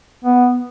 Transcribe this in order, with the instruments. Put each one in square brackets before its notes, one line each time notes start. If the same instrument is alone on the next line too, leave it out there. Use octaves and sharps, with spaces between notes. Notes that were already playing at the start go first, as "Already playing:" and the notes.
[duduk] B3